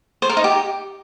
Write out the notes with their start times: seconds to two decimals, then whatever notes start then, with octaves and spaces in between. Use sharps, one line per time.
0.22 C5
0.29 A#4
0.37 D#4
0.44 G4